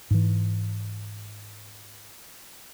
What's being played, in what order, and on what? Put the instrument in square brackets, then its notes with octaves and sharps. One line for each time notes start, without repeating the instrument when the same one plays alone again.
[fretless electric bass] G#2 E3